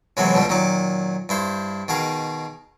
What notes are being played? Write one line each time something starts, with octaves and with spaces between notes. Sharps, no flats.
A2 C3 E3 F#3 G#3 B3
C#2 B2 D3 G3
A#2 D#3 F#3 D6
G2 E4 C5
B2 D#3 G#4 F5